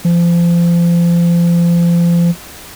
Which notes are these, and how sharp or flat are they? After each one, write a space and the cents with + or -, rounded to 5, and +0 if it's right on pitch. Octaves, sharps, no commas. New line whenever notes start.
F3 -30